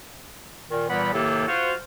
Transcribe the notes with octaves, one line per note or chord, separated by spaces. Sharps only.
A#2 D#3
A#2 E3 G3 B3 F#5 B5
A2 C3 D#3 A#3 G4 A4
F4 F#4 C5